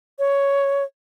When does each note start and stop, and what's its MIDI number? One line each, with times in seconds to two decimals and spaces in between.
0.19 0.84 73